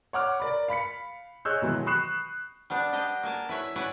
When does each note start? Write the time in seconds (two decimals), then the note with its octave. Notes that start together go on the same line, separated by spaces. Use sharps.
0.13 C#5 F#5 D6 F6
0.40 A#4 D5 B5
0.68 F5 B5 B6 C#7
1.45 G#4 C#5 D#5 E6 F#6 G6
1.62 B2 D#3 E3 F#3 G#3
1.86 B5 C#6 D#6 F#6 C7 E7
2.70 G3 B3 D4
2.93 D4 G4 D#5
3.23 A#3 G#5 A5
3.49 E4 B4 C#5 E5
3.76 B4 C#5 D5 F#5 G#5